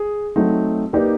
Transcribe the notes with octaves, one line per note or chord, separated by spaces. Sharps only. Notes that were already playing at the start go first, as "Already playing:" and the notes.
Already playing: G#4
F#3 A3 C4 D#4 F#4
A#3 D#4 G4 B4 D5